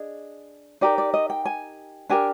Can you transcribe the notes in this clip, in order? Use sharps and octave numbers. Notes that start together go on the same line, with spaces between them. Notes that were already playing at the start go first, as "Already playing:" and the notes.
Already playing: D4 G#4 D#5
D#4 G4 A#4 D5
D5
D#5
G5
G#5
D4 G4 A#4 G#5